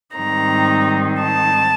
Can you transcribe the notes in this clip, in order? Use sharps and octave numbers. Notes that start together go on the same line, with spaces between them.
G#2 D#3 G3 C4 D#4 A#5
A5